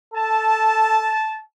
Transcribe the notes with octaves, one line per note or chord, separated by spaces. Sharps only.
A4 A5